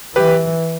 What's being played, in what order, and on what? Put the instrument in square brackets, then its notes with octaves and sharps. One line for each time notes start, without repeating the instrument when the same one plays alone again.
[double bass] E3 [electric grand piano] G4 B4